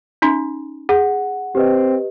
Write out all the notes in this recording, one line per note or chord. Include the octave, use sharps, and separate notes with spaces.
C#4 D#4 C6
G#4 F#5
C4 G4 B4 D#5